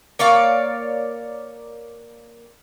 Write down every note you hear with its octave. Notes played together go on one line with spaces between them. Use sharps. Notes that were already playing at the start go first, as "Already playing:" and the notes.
A#3 C#5 D5 F5